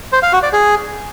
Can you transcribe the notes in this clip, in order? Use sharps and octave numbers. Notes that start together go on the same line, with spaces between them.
C5
F5
F#4
D5
G#4